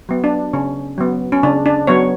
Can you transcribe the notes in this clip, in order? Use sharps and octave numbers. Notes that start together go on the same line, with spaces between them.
F#3 B3
D4
C#3 C#4
F#3 B3
C#4
C#3 D4
D4
F#3 B3 C#5